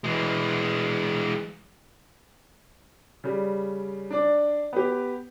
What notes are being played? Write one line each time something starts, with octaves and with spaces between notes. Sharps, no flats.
E3 G#3
C#3 G3
D4 D5
B3 G4